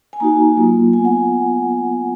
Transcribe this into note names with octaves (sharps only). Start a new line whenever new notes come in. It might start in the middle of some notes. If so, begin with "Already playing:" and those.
G#5
A#3 D#4 F#4 A#5
F#3 A#3 F4
B3 F4 G#5
F#5